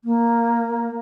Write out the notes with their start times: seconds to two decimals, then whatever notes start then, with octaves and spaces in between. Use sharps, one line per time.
0.04 A#3